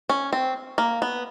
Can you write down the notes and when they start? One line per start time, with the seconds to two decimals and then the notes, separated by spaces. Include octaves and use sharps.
0.09 C#4
0.33 C4
0.78 A#3
1.02 B3